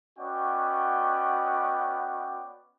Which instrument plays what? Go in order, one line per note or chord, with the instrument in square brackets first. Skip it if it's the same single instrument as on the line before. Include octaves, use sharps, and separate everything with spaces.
[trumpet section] B3 C#4 F#4 D5 D#5 G5